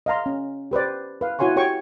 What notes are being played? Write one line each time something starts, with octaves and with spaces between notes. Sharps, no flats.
D#5 F5 A#5 C6
C#4
G4 B4 C5 D5
B4 F5
E4 F#4 C#5 G#5 C6 C#6
F#4 G4 C#5 G5 C#6